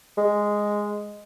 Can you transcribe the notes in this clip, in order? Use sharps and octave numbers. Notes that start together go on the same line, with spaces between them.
G#3